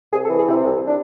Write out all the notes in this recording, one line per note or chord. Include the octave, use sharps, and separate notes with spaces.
C2 G#4
A4
E3
G#4
C3 E4
C2
D4